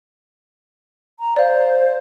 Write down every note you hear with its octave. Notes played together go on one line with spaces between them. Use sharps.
A#5
C5 D5 F5